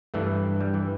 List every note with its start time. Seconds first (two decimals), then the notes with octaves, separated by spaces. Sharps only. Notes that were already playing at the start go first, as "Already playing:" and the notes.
0.14 G2 E3 A3
0.61 G3
0.74 E3